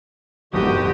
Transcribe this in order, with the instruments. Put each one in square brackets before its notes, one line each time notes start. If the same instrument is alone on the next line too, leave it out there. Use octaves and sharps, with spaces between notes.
[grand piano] F#1 E2 G#2 [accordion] D3 F#4 D#6 [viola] G4